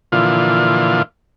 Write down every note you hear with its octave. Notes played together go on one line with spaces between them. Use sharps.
A#2 D3 E3 F3 F4